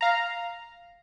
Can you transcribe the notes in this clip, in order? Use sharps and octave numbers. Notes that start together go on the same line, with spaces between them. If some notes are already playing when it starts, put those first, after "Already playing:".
F5 A#5